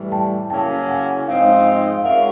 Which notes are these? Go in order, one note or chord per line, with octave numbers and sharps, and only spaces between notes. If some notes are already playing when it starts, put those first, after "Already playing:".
Already playing: A2 E3 G3
G5 A5
C#3 F#3 A#3 C#4 E4 G5 A5
F#5 G#5
G#2 F3 G#3 C4 D#4 F5 G5
F5
G#3 C#4 F4 A#4 E5 F#5